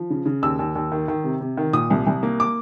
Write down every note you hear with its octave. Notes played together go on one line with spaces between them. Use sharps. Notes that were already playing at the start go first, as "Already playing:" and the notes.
Already playing: F3
C#3
C#3
D#2 E6
D#2
D#2
D#3
D#3
C3
C3
D#3
A#2 D#6
C2
C2
A#3
D6